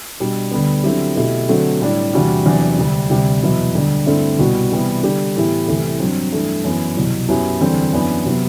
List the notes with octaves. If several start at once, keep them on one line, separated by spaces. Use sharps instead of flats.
B2 G3 D4 G4
D2 D3 G3 B3
D3 F#3 C4 E4 G4
B2 A3 E4 G4
D3 F#3 A3 C4 F#4
A2 G3 D4
E2 C3 G3 D4 F#4
E2 C3 F#3 B3 D4
D2 C3 G3
D2 C3 G3
E2 B2 F#3 B3 E4
D2 D3 G3 D4
G2 D3 A3 C4 E4
C2 B2 G3 B3 F#4
C3 E3 G3 B3
D3 G3 D4 G4
A2 E3 B3 E4 G4
C2 C3 E3 A3
G2 F#3 C4
G2 E3 A3
F#2 E3 B3
C2 B2 F#3
F#2 F#3 B3 E4 G4
E2 D3 G3 C4
F#2 E3 B3 D4
C3 F#3 B3